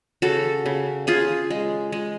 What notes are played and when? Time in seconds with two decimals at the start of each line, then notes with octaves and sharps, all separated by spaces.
0.22 C#3 F#4 A4
0.66 C#3
1.07 C#3 F4 G#4
1.50 G#3
1.92 G#3